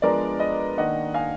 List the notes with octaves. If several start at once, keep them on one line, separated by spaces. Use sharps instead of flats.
F3 G#3 B3 D4 A#4 D5
B4 D#5
D#3 A#3 D4 D#5 F#5
F5 G#5